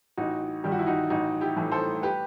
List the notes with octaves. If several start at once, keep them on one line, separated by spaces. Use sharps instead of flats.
A1 D#4 F#4
G2 D#3 G3 G4
F#4
E4
D#4 F#4
A1 D#4 F#4
E4 G4
A2 E3 A3
A4 C5
G4 B4